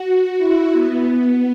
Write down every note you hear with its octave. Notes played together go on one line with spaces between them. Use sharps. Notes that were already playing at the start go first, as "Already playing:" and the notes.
Already playing: F#4
E4
B3